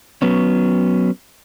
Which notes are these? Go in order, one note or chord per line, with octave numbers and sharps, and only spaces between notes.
F#3 B3 C#4